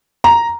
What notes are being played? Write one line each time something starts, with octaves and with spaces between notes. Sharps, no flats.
A#5